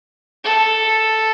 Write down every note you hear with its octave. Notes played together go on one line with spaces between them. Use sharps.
A4